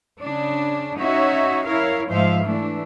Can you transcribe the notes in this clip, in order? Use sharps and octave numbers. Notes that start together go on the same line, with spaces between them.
C#3 D4
C#4 D#4 F#4 C#5 E5
E4 A#4 C#5 F5
G#2 F3 G#3 C5 E5 F5
E3 A3 D4